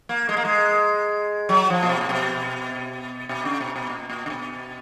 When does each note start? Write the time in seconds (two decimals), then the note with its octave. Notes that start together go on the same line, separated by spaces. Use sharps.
0.09 A#3
0.29 G#3
0.37 A#3
0.45 G#3
1.49 F#3
1.70 F3
1.83 A#2
1.89 B2
2.01 A#2
2.09 B2
3.29 B2
3.45 C#3
3.60 B2
3.76 B2
3.90 A#2
4.10 A#2
4.26 C#3
4.30 B2